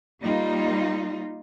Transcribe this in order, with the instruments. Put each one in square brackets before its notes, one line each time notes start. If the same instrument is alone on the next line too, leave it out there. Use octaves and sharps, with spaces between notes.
[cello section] G3 A#3 D#4 F4